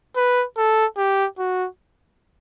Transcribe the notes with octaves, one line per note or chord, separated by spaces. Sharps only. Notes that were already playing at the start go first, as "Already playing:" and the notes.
B4
A4
G4
F#4